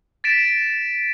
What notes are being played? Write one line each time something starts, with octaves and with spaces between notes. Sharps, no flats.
A6 B6 D7 E7